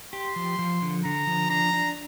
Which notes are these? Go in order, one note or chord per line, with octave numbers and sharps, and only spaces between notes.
G4 C6
F3
F3
D3
D3 A#5
F3
D4 A#5
D4